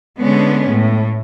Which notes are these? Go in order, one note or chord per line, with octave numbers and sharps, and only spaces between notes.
D3 G#3 B3 C#4
A2